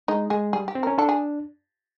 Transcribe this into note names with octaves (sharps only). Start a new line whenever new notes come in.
G#3 D#4
G#3 G#4
G3 G#4
G4
C4
C#4 A#4
D4 A4
G#4